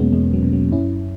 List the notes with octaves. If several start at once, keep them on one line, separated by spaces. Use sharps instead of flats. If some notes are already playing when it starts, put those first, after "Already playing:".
Already playing: E2 B2 F#3 G#3 A#3 B3 C#4
E2 G#3
F#3
B2
F#3
F#2 C#4 E4